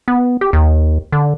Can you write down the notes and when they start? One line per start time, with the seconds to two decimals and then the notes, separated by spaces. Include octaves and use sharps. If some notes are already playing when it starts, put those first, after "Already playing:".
0.08 B3
0.41 G4
0.53 D#2
1.12 D3